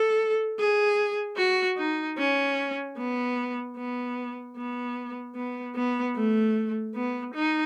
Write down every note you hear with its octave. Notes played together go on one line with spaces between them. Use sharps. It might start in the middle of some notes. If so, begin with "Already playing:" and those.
Already playing: A4
G#4
F#4
D#4
C#4
B3
B3
B3
B3
B3
A3
B3
D#4